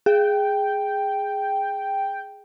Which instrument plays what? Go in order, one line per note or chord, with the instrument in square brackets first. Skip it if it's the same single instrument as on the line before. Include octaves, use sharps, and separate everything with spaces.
[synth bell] G#4 [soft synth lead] G5